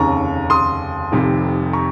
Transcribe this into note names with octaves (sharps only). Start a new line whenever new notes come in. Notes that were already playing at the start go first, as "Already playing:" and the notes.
Already playing: F1 D#2 C#3 A#5 C#6
C6 D#6
F1 F2 C3 D#3
A#5 C#6